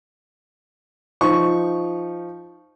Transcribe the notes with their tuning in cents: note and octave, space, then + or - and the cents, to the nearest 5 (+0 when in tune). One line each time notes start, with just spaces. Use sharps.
F3 -5 D#4 +0 C#6 +0